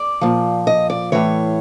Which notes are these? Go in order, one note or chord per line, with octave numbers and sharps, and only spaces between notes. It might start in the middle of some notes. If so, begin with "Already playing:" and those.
Already playing: D5
A#2 F3
D#5
D5
A2 E3 C#5